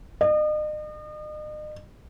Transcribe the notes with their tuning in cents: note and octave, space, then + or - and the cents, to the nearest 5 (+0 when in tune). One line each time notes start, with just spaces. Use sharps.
D#5 -40